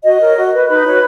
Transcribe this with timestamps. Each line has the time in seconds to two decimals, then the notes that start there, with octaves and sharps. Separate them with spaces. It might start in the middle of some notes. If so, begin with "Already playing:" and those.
0.04 F#4 D#5
0.21 A#4 C#5
0.37 F#4
0.53 B4
0.69 D#4 B4 B5
0.85 F#4 C#5